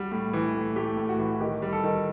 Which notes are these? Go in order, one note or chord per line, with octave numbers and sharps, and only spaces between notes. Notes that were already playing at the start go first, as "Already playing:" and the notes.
Already playing: G3 F#4
A2
E3
A2
A3 G4
A2
F#4
E3
D#3 G4
G3
A4
D#3